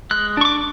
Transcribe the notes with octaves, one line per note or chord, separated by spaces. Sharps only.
G#3 F#6
D4 C#6
D6